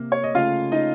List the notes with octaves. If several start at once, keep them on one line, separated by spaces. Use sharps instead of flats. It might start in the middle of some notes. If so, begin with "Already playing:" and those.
Already playing: C3 A#3
C#5
D#5
C#3 A3 F4 F5
D#4 D#5